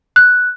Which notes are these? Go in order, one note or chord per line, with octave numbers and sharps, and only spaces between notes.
F#6